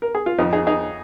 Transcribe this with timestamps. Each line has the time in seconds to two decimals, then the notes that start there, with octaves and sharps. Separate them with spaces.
0.02 A#4
0.15 G#4
0.26 F4
0.39 F2 F3 D#4
0.53 D#4 G#4
0.67 D#4 G#4